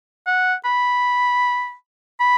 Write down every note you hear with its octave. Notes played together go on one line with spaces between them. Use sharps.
F#5
B5
B5